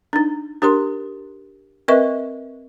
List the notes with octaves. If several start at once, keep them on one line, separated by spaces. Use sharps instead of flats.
D4 D#4
D4 G4 A#4 C6
C4 A#4 B4 D#5 E5 C#6